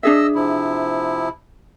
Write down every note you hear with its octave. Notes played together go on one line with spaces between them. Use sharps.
D4 G#4 D#5 E5 E6
C3 F3 E4